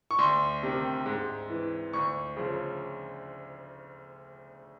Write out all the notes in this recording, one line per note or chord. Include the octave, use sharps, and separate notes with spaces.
C#6
D2 C6
C3 D#3
G#2
E3
D2 C#6
C#3 F3